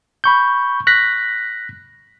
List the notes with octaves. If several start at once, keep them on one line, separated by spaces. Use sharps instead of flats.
B5 C#6 G6
F#6 A#6 B6